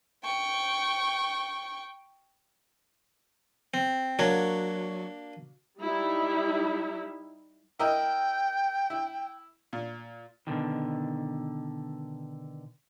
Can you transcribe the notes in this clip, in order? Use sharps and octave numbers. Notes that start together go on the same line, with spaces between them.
G5 C#6
C4
F#3 A#3 D4
G3 D#4 E4
E4 A#4 D#5 G5
E4
A#2
B2 D3 D#3